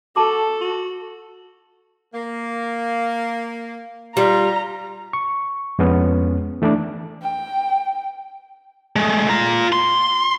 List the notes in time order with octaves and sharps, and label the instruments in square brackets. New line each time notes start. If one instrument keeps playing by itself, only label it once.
[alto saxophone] F#4 [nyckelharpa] A4 [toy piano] G#5 A5 D6
[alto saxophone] F#4
[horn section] A#3
[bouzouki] G3 [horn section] F4 [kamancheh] A#5
[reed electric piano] C#6
F2 G#3 B3 C#4
E3 A3 D4 D5
[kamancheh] G5
[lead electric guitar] G#3 A3
F4 A#5
C6